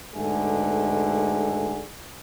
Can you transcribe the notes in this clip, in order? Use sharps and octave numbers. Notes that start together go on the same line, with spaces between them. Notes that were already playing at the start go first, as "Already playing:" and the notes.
G#2 B2 D3 A3 G#4